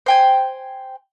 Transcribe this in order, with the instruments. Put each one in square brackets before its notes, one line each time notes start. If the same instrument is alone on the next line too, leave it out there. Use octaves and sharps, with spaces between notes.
[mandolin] C5 G5 G#5